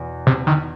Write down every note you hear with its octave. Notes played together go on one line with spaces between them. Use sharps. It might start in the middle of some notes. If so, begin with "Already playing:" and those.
Already playing: E2 B2
C3
D#3